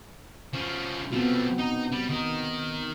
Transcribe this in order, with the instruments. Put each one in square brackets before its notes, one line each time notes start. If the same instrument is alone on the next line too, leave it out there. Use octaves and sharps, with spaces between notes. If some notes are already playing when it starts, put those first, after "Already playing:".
[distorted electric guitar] F3 C#4
[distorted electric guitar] F3 A3 [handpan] B3 C4 F#4
[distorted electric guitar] D#4
G3
D#3 D#4